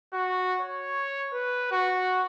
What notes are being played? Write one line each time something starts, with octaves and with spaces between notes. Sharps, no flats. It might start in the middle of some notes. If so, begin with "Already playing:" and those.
F#4
C#5
B4
F#4